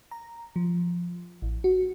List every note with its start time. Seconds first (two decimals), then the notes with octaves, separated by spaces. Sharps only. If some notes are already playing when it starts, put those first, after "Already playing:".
0.11 A#5
0.56 F3
1.42 A1
1.64 F#4